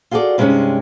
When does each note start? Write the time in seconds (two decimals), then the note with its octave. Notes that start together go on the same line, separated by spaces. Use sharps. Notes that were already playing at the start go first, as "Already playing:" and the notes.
0.11 F4 F#4 G#4 A4 D5
0.38 G2 C3 G#3 B3 C#4 D#4